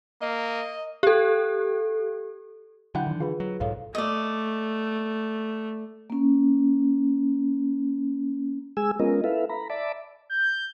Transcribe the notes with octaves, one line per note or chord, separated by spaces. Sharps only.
A#3 D#5
G4 A4
D3 F#3 E4 F#5 G5 B5 G6
D#3 E3
F4 G#4 B4 B5
F#3
B1 G#2 A4 C#5 F5
A3 D5 D#5
A#3 C#4
G#3 G#4 G#5 E6
G#3 B3 C#4 F4 A#4 D#5
E4 A4 B4 E5 F5
A#5 B5
D5 E5 A5 B5 D6
G6